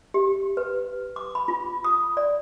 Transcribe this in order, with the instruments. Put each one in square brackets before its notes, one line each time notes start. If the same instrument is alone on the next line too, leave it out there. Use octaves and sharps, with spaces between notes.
[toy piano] G4
B4
D6
B5
F4
D#6
D5